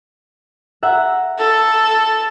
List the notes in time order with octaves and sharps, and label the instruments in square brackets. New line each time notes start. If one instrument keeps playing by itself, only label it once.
[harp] E5 F#5 A#5
[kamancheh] A4